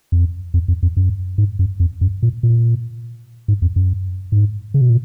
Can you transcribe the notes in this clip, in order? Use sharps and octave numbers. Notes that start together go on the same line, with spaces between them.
F2
F2
F2
F2
F#2
G#2
F#2
F2
F#2
A#2
A#2
G#2
F2
F#2
G#2
C#3
B2
A#2